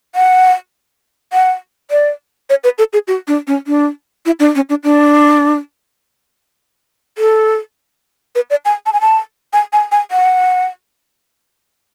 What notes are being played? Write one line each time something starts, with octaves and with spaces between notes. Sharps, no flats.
F#5
F#5
D5
C#5
B4
A4
G#4
F#4
D4
C#4
D4
E4
D4
C#4
D4
D4
A4
B4
D5
G#5
A5
G#5
A5
G#5
G#5
G#5
F#5